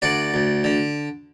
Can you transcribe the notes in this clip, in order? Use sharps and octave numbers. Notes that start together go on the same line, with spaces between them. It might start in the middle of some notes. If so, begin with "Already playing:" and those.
D2 D5 F#5
D2
D3